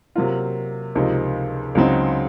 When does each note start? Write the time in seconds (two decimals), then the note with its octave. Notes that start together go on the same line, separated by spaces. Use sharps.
0.16 C3 F#3 A#3 F4
0.95 C#2 C3 F3 A#3 D#4
1.75 C#2 C#3 F#3 C4 D#4